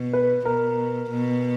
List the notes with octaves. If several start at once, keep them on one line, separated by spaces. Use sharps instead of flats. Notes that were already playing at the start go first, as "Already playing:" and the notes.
Already playing: B2
B4
B2 A#4
B2